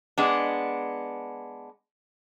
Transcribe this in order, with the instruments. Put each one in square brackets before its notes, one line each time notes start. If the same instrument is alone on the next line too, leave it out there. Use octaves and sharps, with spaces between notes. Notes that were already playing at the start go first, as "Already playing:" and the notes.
[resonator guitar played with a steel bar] G#3 B3 D4